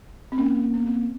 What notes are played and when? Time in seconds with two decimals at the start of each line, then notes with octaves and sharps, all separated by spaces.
0.32 C4
0.38 A#3 C#4
0.74 B3
0.86 C4